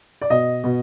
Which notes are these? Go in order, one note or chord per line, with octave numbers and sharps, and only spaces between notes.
D5
B2 D#5
B2